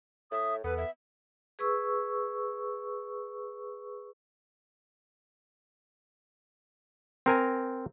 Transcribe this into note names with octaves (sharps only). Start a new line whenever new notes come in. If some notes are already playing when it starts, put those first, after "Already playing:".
A2 E5 D#6
E2 B3 A4 B4
E5
G#4 B4 C#6 E6
C4 A#4 G#5 A#5